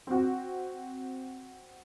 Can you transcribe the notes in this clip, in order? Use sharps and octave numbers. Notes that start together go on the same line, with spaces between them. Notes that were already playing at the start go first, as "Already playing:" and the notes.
C4 F#4